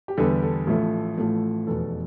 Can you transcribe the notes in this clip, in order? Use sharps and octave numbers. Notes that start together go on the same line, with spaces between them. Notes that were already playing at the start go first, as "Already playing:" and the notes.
G4
E2 D3 G3 B3 A4
A4
A1 A2 F3 A3
A1 A2 F3 A3
F1 E2 B2 A4